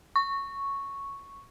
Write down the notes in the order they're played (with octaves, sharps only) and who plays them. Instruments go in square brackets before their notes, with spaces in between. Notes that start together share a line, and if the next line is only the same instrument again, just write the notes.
[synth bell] C#6